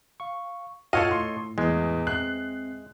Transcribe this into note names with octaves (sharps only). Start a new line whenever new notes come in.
F5 C#6
F#2 A2 F4 A4 C#5 D#5 F5 F#5
A2 C6
E2 G#3
C4 E5 F#6 C7